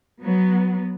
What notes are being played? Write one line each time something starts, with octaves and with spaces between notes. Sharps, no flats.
F#3 B3